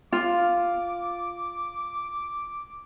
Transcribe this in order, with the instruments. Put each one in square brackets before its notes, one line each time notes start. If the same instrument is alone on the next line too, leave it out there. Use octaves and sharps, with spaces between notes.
[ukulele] F4 [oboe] D6